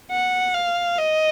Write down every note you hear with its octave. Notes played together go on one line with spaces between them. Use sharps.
F#5
F5
D#5